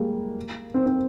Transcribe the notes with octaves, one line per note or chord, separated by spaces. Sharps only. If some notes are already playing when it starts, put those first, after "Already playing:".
Already playing: G3 G#3 A#3
C4
C4